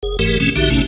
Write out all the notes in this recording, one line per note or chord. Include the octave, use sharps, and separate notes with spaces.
F#1 G#4
F#1 G#2 E3 A3 G4 A#4
B2 E3 A3 C4 C#4
A#1 D3 D#4 F#4 G4 E5
A1 C3 A3 C#4 D#4